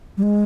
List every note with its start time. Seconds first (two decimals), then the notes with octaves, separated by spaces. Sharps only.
0.17 G3
0.23 G#3